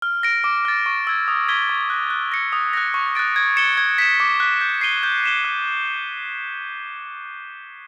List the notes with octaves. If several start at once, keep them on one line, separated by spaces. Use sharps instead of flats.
F6
A#6 D7
D6
F6 A6
C#6
E6 G#6
D#6
G#6 B6 D#7 G7
C#6
F#6 A#6
F#6
A#6 C#7
D#6
F#6 A#6
C#6
F#6 A6 D7
G#6
C#7 E7 G7
G#6
B6 E7
D6
F#6 B6
G6
C7 D#7 G7
G6
B6 E7 G7
F#6